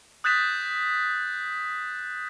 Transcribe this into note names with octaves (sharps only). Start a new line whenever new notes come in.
D#6 F#6 G6 A6 B6 E7